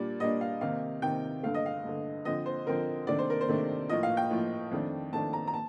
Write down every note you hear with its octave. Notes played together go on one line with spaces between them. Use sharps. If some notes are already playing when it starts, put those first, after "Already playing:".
Already playing: A#2 G3 A#3 D4 D5
A#2 G3 A#3 D4 D#5
F5
C3 D#3 A#3 D#4 F5
C3 D#3 A#3 D#4 G5
G2 D3 A3 F5
D#5
F5
G2 D3 A3
D3 F3 C4 D#5
C5
D3 F3 C4 A#4
C3 D#3 A3 D4 D5
C5
A#4
C5
C3 D#3 A3 D4
A2 F3 A#3 F4 D#5
F5
G5
A2 F3 A#3 F4
F2 D#3 A3 D4
F2 D#3 A3 D4 A5
A#5
A#5
A5